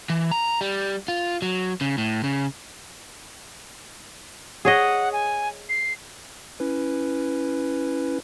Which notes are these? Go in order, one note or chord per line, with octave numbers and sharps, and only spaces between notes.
E3
A#5
G3
F4
F#3
C#3
A2
C#3
G#4 C#5 D#5 F#5
G#5
C7
C#4 E4 B4